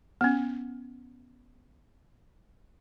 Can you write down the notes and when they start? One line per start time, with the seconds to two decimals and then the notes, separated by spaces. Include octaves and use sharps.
0.21 B3 C#4